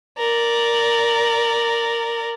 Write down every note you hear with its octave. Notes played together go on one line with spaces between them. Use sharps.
A#4 D5